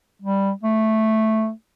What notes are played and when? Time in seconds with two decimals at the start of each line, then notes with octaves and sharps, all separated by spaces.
0.22 G3
0.63 A3